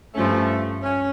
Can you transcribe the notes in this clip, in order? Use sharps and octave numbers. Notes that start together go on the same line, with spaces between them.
G2 F3 A3 C#4
C#4